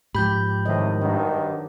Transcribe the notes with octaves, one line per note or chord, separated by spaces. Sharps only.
G#2 F3 G4 B5 G6
A2 C3 D#3 C5 D#5
G2 D#3 F#3 D4